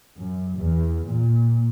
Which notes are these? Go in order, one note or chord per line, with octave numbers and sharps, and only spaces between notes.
F#2
E2
A#2